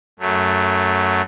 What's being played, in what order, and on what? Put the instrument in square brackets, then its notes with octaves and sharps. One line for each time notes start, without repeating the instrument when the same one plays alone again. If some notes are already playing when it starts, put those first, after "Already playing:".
[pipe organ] F#2 F#3 A3